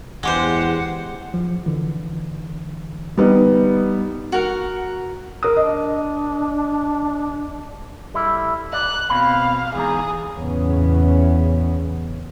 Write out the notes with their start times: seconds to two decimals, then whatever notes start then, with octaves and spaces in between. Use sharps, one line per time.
0.23 E2 G#3 G4 C5 F#5
1.34 F3
1.66 D3 E3
3.17 G3 B3 D#4
4.32 F#4 A#4 F#5
5.43 A#4 D#6
5.57 D4 D#5
8.14 G3 E4 A4
8.73 D5 F#6
9.10 B2 C4 F5 B5
9.75 E2 G#2 G#4 A#5
10.36 E2 A2 C#3 E3 B3 C#4